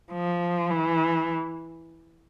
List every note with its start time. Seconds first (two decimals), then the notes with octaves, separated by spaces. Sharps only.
0.12 F3
0.70 E3